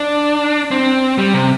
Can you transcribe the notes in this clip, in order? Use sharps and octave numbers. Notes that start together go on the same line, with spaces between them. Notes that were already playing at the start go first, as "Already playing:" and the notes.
Already playing: D4
C4
G3
C3